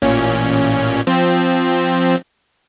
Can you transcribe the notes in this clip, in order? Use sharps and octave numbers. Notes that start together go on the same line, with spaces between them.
A1 A#2 C#4
F3 C4